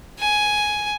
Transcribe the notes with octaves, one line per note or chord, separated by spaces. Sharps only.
G#5